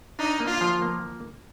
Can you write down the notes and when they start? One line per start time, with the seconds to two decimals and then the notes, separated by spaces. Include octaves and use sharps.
0.19 D4 D#4
0.40 A#3
0.47 F4
0.61 F3
0.82 A#3